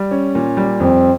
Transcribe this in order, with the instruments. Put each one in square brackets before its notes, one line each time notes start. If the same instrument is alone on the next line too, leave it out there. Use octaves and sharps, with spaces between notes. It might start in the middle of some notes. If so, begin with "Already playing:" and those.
Already playing: [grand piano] G3
C#4
A#2
G3
[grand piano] F2 [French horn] C4